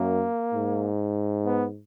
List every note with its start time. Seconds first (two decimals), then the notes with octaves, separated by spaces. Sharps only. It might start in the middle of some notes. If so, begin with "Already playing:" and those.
Already playing: F#2 A#3
0.54 G#2
1.45 B3